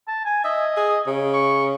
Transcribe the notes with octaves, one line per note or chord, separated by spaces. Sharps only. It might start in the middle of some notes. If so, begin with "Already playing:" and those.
A5
G#5
D#5 E5
G#4
C#3
C#6